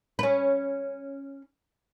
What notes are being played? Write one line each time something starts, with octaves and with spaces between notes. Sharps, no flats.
C#4 B4